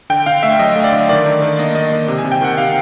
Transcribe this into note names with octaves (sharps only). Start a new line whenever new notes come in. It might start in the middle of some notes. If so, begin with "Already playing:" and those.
D3 G5
D3 F5
A3 E5
F#3 D#5
A3
D5
D3
D#3 D5
D#3
D#3
A#3 D#5
A#3 D#5
D#3
C3
G#5
C3
G5
D#3 F#5
C3 F5